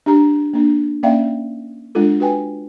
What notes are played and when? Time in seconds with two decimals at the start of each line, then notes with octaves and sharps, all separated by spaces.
0.06 D4 G4 A#5
0.53 A#3 D4
1.03 A#3 C#4 D5 E5 F5 G5
1.95 G#3 D4 F4 A4
2.20 F#4 B4 G5 G#5